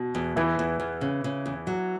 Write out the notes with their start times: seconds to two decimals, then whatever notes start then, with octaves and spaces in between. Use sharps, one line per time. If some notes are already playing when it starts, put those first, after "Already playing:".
Already playing: B2
0.15 E2
0.36 E2 E3 E4
0.59 E2
0.80 E2
1.01 C#3
1.24 C#3
1.46 E2
1.67 F#3